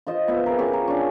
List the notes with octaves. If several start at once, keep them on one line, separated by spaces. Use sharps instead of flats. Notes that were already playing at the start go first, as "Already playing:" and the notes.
F4 C5 D#5
B3 F4 E5 G5
G#4 A#4
C#4 F4 G4 G#4
A#4
C#4 D4